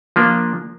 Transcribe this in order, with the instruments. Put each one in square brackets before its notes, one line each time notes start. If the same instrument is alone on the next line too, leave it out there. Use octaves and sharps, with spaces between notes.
[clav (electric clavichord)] F3 A#3 D4